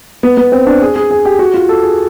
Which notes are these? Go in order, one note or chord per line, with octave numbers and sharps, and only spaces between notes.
B3
B3
C4
D4
G#4
G#4
G#4
G4
F#4
F4
A4
G#4